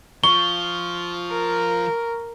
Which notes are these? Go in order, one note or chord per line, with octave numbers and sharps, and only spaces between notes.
F3 C#6 G7
A#4